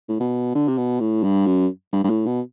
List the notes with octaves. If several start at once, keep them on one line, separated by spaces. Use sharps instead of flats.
A2
B2
D3
C3
B2
A2
G2
F#2
G2
G2
A2
B2